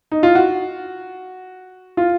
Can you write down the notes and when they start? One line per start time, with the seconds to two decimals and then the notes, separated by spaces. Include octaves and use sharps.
0.12 D#4
0.23 F4
0.35 F#4
1.97 F4